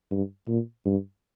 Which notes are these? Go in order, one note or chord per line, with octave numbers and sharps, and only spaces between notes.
G2
A#2
G2